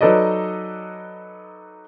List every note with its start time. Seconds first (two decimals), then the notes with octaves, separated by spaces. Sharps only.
0.01 F#3 D#4 A4 B4 D5 D#5